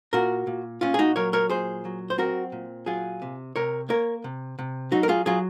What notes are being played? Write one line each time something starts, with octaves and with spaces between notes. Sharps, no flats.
A#2 F#4 A#4
A#2
A#2 C#4 F4
G#4
D#4 F#4
F#3 A#4 C#5
A#4 C#5
A#2 G#4 C5
F#3
C5
C4 F#4 A#4
A#2
F#3 F4 G#4
C3
C3 A#4 C#5
A#3 A#4 C#5
C3
C3
F#3 D#4 F#4
A#4
F4 G#4
F#3 F4 G#4